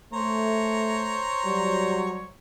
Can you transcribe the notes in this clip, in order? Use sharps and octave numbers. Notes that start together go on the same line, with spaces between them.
A3 C5 C#5 A#5
F#3 G3